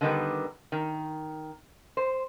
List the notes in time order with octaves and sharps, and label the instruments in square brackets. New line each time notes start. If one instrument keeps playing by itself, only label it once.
[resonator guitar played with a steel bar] D3 D#3 G3 B3
D#3
C5